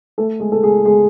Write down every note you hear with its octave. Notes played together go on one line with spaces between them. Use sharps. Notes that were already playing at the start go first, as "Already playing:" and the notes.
A3 A4
G#3 G#4
A4
G#3 G#4
G#3 G#4